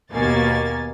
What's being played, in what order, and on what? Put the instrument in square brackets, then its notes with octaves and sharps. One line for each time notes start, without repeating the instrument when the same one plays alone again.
[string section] D#2 B2 A#3 G#5 A6